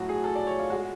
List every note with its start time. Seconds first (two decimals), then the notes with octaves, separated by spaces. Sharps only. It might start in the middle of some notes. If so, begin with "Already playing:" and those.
Already playing: A2 F#3 F#4
0.09 G#4
0.24 A4
0.35 D5
0.47 C#5
0.59 F4
0.70 G#3 F#4